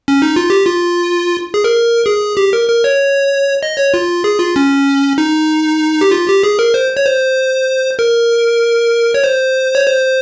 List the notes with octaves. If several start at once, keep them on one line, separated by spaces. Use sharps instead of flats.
C#4
D#4
F4
G4
F4
G#4
A#4
G#4
G4
A#4
A#4
C#5
D#5
C#5
F4
G#4
F4
C#4
D#4
G4
F4
G4
G#4
A#4
C5
C#5
C5
A#4
C#5
C5
C#5
C5